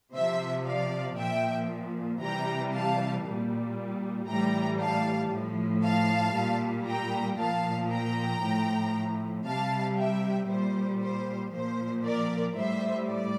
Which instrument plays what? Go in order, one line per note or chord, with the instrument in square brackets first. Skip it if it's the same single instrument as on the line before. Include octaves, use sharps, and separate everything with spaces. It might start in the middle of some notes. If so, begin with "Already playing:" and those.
[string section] C3 F3 C5 E5
D5 F5
A#2 F3 E5 G5
C3 E3 G3 G5 A#5
F5 A5
A#2 G3
A2 E3 G3 G5 A#5
F5 A5
A2 F3
F5 A5
A#2 G3
G5 A#5
A#2 F3 F5 A5
G5 A#5
A2 F3
C3 G3 F5 A5
E5 G5
A#2 G3 C5
C5
A#2 F3 C5
A#4 D5
A2 G3 C5 E5
D5